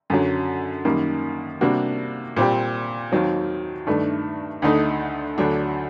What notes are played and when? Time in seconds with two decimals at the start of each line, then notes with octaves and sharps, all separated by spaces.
0.10 F#2 D3 F#3
0.85 F#2 D#3 G3 A#3
1.61 C3 G3 A#3 D4 F#4
2.37 A#2 G3 C4 G4
3.12 D#2 D#3 F#3 C4
3.87 G2 D#3 A3 D4
4.62 D2 D3 A3 D#4
5.38 D2 D3 F#3 A3 D4